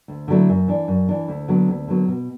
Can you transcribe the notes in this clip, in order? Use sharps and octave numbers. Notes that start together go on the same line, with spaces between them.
D2
D3 F#3 A3 E4
F#2
E3 D4
F#2
E3 D4
D2
D3 F#3 B3
D2
D3 F#3 B3
B2